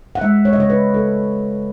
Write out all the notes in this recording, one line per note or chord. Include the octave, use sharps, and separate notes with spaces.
F#5
G#3 E5
C#5
D#5
C#3 C#5
B4
C#3 A4